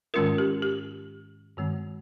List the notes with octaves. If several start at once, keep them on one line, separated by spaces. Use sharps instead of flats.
G#2 D#3 G#3 C#4 F4 A#4
G4
G4
G2 D#3 G#3 C4